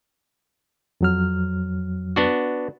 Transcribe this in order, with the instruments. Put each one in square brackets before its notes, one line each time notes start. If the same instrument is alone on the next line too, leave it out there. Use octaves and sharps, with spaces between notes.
[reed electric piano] F2 F#3 F6
[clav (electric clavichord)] B3 D4 F#4